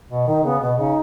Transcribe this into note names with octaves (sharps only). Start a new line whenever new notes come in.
B2
D#3 D#4
C#3 B3
B2 B3
C#3 D#4